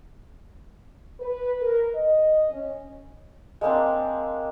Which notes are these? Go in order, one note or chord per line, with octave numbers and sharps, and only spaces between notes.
B4
A#4
D#5
C#4
G#3 A#3 C4 D4